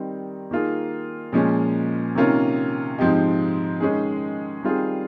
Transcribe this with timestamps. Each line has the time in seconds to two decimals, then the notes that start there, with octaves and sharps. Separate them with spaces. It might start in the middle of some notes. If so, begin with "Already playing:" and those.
Already playing: D#3 G3 C4 D#4
0.51 D#3 A#3 F4 G#4
1.33 A#2 F3 G#3 C#4
2.15 C3 D#3 A#3 C#4 F4
2.98 G#2 F3 C4 D#4 G4
3.80 D#3 G#3 C#4 G#4
4.63 D#3 G3 C4 F4 G#4